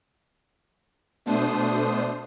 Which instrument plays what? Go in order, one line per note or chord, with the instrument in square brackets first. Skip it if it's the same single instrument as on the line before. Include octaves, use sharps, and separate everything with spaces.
[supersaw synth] B2 A3 D4 C5 D#6 C7